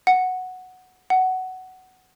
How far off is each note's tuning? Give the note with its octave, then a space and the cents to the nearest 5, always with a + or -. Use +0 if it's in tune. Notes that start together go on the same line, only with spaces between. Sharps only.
F#5 -5
F#5 +10